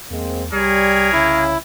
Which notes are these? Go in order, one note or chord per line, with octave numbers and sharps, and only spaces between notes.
E2 G#3 A#3 C4
C2 G3 G#4 A#4 C#5
C#3 E4